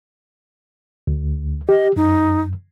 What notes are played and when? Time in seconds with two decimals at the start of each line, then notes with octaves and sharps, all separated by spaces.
1.07 D2
1.69 G4 D#5
1.96 F#2 D#4